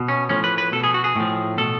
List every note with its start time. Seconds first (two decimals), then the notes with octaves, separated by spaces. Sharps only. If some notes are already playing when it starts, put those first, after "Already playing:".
Already playing: B2
0.08 C#4
0.29 A2 F3 C#4
0.44 B4
0.58 B4
0.72 B2 A4
0.84 G#4
0.94 F#4
1.04 G#4
1.16 A2 F3
1.58 B2 A4